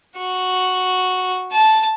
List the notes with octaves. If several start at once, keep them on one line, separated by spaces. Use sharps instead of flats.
F#4
A5